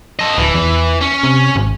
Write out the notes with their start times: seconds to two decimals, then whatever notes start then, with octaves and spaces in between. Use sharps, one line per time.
0.19 A4 D#5
0.38 D1 E3
0.54 E2
1.01 C#4
1.23 C3
1.56 G#1